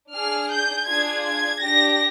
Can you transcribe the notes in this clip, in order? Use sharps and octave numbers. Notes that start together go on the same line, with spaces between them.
D4 G#4 F6
G6
D4 F4 G#4 G#6
G#6
D4 G4 A#6